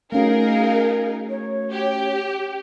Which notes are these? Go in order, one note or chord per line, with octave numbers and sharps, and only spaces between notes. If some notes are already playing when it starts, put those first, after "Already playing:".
A3 C#4 D#4 F#4 G#4 A#4 F5
C#5
G4